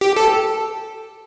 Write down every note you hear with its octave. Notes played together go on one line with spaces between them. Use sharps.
G4
A4